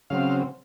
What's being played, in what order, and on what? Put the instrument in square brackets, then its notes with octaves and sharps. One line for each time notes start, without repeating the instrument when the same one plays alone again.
[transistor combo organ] C#3 F#3 C4 F5